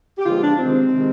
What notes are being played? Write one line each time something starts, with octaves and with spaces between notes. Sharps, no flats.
G4
D3 F3 G#3 B3 F4
D4
C3 D#3 G#3 C4
C3 D#3 G#3